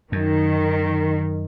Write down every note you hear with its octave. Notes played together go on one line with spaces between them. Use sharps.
F#2 D#3